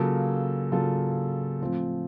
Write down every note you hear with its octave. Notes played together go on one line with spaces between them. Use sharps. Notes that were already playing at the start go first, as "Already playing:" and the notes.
Already playing: C#3 F#3 A#3 F4 A4
C#3 F#3 A#3 F4 A4
A2 F3 C4 F4